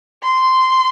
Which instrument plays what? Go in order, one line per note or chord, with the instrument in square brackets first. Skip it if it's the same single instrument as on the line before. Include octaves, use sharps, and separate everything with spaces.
[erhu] C6